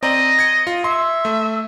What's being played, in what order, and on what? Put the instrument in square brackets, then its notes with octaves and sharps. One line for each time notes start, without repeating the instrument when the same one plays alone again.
[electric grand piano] C4 D5 A#5 [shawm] D#5
[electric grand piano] G#6 C#7
F4
[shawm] E5 [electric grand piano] C6
[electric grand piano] A3